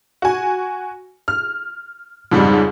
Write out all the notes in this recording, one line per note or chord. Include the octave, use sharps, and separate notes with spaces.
F#4 G#5
F6
F2 G#2 C#3 G3 G#3